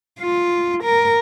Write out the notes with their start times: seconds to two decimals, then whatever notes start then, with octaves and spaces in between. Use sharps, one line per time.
0.20 F4
0.84 A#4